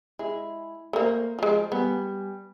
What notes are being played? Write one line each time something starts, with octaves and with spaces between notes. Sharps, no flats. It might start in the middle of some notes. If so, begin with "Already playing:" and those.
G#3 E4
A3 A#3 A#4 C5
F3 G#3
G3 B3 G#5